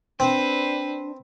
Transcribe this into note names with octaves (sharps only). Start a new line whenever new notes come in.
C4 D4 B4 C5